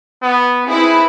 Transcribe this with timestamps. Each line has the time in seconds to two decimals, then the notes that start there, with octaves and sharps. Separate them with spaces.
0.22 B3
0.67 C4 E4 G#4 B4